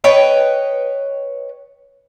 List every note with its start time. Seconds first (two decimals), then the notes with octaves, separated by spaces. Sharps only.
0.04 B4 C#5 D#5 G5